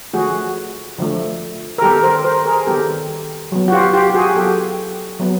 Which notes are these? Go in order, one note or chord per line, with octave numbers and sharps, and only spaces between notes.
D3 F3 A3 F#4 G#4
D3 F3 A3
A#4
D#3 G3 B3 G4 A4
A#4 C5
A#4 C5
G#4 A#4
D#3 G3 B3 G4 A4
F#3 B3
F#4
F4 G4
F4 G4
G4
F#4 G#4
F#3 B3 G4 A4
F#3 B3